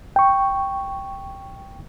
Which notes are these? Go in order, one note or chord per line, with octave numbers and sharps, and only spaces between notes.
G5 C#6